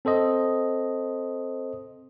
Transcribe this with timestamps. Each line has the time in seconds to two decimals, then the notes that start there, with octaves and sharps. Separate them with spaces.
0.05 C4 A4 C5 D#5